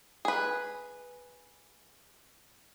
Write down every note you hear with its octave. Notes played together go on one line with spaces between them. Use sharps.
G#4 B4